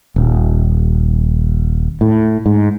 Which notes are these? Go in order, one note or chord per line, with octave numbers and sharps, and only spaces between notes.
D#1
A2
G#2